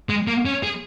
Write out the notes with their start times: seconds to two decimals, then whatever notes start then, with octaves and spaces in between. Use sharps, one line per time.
0.09 G#3
0.27 A#3
0.45 C#4
0.63 G#4